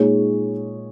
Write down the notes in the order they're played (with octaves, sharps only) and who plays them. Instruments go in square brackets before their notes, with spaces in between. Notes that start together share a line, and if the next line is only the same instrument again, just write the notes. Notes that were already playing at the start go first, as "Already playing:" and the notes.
Already playing: [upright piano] A#2 G#3 D#4 G#4 C#5